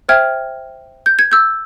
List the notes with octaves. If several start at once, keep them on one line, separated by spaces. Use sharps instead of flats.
C5 E5 G5 F6 G#6
G6
G#6
E6 G6